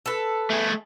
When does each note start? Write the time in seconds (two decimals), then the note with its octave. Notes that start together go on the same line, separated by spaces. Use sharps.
0.06 A4 B4
0.50 A3 G#4